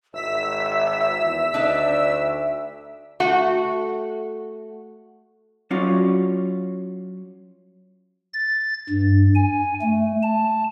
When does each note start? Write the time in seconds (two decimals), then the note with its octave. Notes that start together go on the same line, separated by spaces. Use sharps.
0.14 G#1 E5 E6 B6
1.21 E2
1.54 D2 D4 D#4 D5
3.20 A3 F#4
5.71 F#3 C#4 F4 F#4 D5
8.34 A6
8.89 G2
9.35 G#5
9.81 A3
10.23 A5